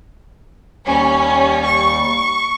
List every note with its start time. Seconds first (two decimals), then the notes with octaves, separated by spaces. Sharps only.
0.87 D#2 G3 C#4
1.66 C#6